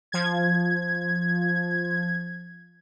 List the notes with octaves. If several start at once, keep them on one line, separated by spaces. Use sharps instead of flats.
F3 G#6